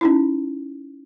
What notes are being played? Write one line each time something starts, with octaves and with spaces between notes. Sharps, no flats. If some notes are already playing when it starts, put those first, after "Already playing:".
C#4 D#4 E4